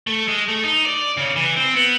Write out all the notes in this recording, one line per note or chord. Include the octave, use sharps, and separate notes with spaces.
A3
G#3
A3
D#4
D5
C#3
E3
C4
B3